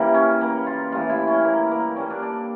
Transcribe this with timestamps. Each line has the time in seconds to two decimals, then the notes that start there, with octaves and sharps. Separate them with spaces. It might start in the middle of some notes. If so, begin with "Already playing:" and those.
Already playing: C#3 E3 G3 A#3 E4
0.14 C#4
0.41 A#3
0.67 F4
0.92 A2 E3 G3 F4
1.09 E4
1.27 C#4
1.45 A#3
1.71 A#3
1.96 A#2 G3 C#4
2.10 D4
2.22 D4